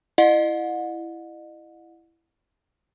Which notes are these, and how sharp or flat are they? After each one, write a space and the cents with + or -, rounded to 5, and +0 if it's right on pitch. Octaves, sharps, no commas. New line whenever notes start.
E4 +10 D#5 -35 F#5 -35